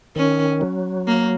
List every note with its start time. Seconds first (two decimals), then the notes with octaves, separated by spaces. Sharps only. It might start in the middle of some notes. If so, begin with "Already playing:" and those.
0.16 D#3 C#4
0.61 F#3
1.07 A#3